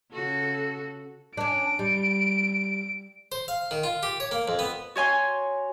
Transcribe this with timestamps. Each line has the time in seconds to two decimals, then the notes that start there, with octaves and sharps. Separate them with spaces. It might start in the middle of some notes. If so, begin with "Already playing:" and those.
0.12 C#3 F#4 A4
1.37 C#4 D4 D7
1.79 G3
3.32 C5
3.48 F5
3.71 D#3
3.84 F4
4.03 G4
4.20 C#5
4.31 A#3
4.48 F2
4.59 B3
4.96 F#4 C#5 G#5 C6